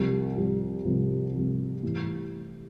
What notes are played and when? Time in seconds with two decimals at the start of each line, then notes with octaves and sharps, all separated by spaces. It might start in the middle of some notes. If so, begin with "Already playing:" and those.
Already playing: C2 C3 F3
0.36 C2 C3 F3
0.84 C2 C3 F3
1.34 C2 C3 F3
1.83 A2 E3 G3